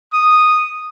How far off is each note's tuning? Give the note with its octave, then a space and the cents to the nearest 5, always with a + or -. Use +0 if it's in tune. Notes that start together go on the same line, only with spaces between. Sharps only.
D#6 -5